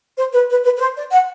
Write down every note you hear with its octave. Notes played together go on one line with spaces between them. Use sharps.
C5
B4
B4
B4
B4
C5
D5
F#5